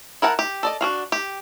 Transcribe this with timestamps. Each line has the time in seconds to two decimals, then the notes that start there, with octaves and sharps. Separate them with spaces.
0.22 E4 A#4 F#5 A5
0.39 G4
0.63 A4 D5 D#5
0.81 D4 F#4 F5
1.12 G4